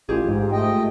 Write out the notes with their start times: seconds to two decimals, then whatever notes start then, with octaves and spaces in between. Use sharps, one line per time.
0.09 A1 F4 G4 G#4
0.28 G#2
0.52 A3 D#5 G5